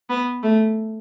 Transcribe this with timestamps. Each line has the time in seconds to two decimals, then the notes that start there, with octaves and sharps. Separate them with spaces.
0.10 B3
0.43 A3